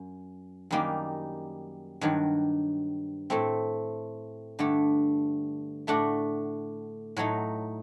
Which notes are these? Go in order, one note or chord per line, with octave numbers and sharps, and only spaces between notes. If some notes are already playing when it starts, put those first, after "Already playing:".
Already playing: F#2
F#2 D#3 G3 A#3 D#4
G2 D#3 F#3
A2 A3 C4
G2 D3 A3
A2 A3 D4 F#4
A2 F#3 A3 D#4